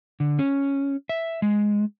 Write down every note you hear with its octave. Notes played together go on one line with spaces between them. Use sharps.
D3
C#4
E5
G#3